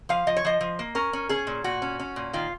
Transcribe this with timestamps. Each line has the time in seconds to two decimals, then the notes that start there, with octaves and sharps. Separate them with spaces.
0.09 F3 F5
0.27 F3 D#5
0.37 C#5
0.45 F3 D#5
0.61 F3
0.79 A#3
0.95 C#4 A#4
1.13 C#4
1.29 C#4 G#4
1.47 A#2
1.64 A#2 F#4
1.82 C#4
1.99 C#4
2.16 A#2
2.33 D#3 F4